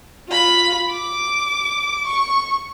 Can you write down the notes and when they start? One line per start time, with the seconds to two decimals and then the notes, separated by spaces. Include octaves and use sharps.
0.28 F4 B5
0.91 D6
2.06 C#6